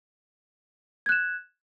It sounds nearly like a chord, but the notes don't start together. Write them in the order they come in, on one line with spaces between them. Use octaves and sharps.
G#6 F#6 E7